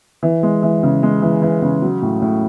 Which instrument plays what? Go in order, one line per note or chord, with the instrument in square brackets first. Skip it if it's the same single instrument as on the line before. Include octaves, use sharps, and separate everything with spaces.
[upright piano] E3
G#3
E3
C#3
G#3
E3
E3
C#3
F#3
A2
A2